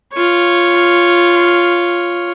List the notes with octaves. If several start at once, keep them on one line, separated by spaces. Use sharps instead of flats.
F4 C#5